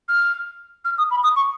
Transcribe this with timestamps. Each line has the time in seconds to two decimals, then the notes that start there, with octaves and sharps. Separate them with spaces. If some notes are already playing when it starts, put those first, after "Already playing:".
0.09 F6
0.85 F6
0.98 D#6
1.11 B5
1.23 D#6
1.36 C#6